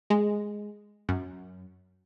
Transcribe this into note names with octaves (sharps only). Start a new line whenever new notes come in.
G#3
F#2